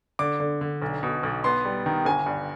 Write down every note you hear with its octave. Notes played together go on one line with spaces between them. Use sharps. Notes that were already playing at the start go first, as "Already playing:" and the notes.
D3 D6
D3
D3
B1
B2
B1
B3 C6
G3
D#3
G1 G#5
G2